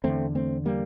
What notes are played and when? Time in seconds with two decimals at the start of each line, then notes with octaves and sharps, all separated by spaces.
0.04 E2 D3 A3 C4
0.35 A3 C4
0.66 G3 A#3